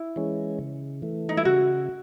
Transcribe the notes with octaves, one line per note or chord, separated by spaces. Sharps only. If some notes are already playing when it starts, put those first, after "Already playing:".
Already playing: E4
E3 G#3 C#4
C#3
E3 A3
D#4
E4
C#3 F#4